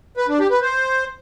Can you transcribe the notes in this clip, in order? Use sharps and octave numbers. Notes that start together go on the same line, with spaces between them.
B4
D4
G4
B4
C5